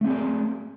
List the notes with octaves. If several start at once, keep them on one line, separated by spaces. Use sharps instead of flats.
A3 C4 G#4 D5